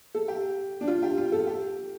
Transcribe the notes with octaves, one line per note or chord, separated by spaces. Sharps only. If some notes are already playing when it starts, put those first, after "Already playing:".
A4
G4
D4
F4
G4
F4
A4
G4